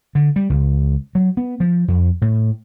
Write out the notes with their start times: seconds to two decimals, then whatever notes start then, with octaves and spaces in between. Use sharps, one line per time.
0.15 D3
0.36 G3
0.50 C#2
1.15 F#3
1.37 B3
1.60 F3
1.88 F2
2.22 A2